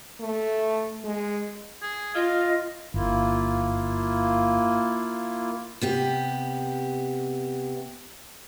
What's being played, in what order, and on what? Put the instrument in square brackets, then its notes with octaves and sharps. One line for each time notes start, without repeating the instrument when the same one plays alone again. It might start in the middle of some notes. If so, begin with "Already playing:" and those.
[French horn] A3
G#3
[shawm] G#4
[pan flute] F4 [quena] D#5 [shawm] F5
[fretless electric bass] G1 [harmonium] A#3 E4 F4
[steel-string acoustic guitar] C3 B3 G4